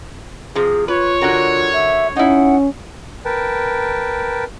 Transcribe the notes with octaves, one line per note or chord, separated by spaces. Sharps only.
C3 F3 G#4
F4 B4 C#5
D3 F#4 A#4
E5
C#4 D#4 E4 F#5
A#4 B4 G5 A5